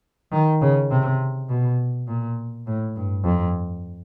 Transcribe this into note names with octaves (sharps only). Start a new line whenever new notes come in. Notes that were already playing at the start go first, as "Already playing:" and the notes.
D#3
C#3
C3
B2
A#2
A2
G2
F2